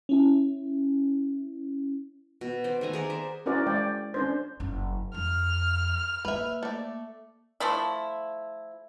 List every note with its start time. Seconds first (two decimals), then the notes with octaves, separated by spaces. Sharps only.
0.09 C#4 E4
2.41 B2
2.64 C5 D5
2.81 D#3 A3 G#5 A#5
2.93 G#4 A#4 D5 F#5
3.10 C5 E5
3.46 C#4 E4 F#4 A#4 C5 D5
3.67 G#3 D5 G5
4.14 C#4 D4 C5
4.60 F#1 C#4
5.14 F2 F6
6.25 A#3 B4 E5
6.63 A3 D5
7.60 F3 A3 E4